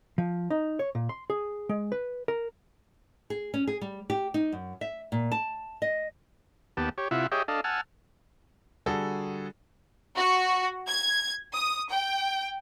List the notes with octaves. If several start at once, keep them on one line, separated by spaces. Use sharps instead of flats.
F3
D#4
C#5
A#2
C6
G#4
G#3
B4
A#4
G#4
C#4
G#4
G3
G4
D#4
F#2
E5
A#2
A5
D#5
D#2 B3 G4 A5
G4 C#5
C3 E4 F4 E5 F#5
G4 G#4 C#5 D#5 E5 G5
D4 A4 D#5 F5
F#5 G#5 A5 E6 F6
D3 G3 F#4 G#4 A4
F#4
G#6
D#6
G5